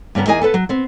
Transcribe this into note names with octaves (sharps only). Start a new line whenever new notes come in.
G2 C#3 B3 A#4
E2 D#4 G#4 A#4 D#5 G#5
B3 A4 B4
F#3
B3 C4